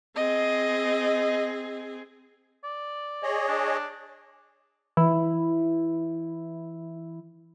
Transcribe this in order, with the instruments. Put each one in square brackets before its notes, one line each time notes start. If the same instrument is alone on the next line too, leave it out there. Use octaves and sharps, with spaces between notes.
[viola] C4 G#4 [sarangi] D#5
[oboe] D5
[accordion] G#4 C#5 D#5
[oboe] D4
[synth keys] E3 E4